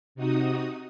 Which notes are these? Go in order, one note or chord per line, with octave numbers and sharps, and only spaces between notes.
C3 D#4 F#4 D#6